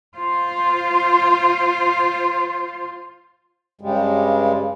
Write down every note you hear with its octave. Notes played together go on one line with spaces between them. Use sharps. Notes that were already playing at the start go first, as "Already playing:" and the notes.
F4 C5
G2 C#3 G3 G#3